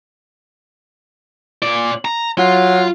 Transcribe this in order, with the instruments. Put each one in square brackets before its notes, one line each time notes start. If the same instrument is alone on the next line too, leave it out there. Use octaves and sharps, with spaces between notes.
[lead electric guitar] A#2 D5
A#5
[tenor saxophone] F#3 [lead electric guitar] F4